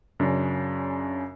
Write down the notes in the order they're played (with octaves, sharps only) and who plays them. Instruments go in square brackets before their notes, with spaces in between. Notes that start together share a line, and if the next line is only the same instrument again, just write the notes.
[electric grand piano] F#2 C#3 D4